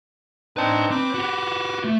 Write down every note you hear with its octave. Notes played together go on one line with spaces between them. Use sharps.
C4 D4 D#4 B4 A5
C4 B4 D6
F#4 G4
A3